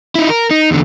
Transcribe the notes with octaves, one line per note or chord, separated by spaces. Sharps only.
D#4 E4
A#4
D#4
E2 D3